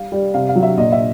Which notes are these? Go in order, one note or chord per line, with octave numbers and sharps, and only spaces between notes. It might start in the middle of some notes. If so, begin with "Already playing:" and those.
Already playing: G3 F5
G3
C3 F5
F5
F#3
E5
A#2 D#5
E5